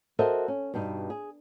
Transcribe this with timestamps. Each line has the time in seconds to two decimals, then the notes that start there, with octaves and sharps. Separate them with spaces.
0.19 F#4 A4 A#4 C5 D#5 E5
0.48 C#4
0.74 G2 B2 G3 D#4
1.10 G#4